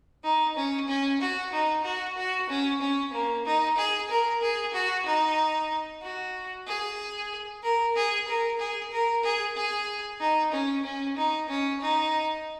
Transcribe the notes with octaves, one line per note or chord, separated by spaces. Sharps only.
D#4
C#4
C#4
F#4
D#4
F#4
F#4
C#4
C#4
A#3
D#4
G#4
A#4
G#4
F#4
D#4
F#4
G#4
A#4
G#4
A#4
G#4
A#4
G#4
G#4
D#4
C#4
C#4
D#4
C#4
D#4